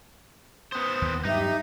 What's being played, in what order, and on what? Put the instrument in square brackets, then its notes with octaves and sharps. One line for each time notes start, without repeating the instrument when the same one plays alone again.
[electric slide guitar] B3 C5 [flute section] D#6
[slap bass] D#2
[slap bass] G2 F3 F#3 [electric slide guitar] D#4 [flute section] G4 E5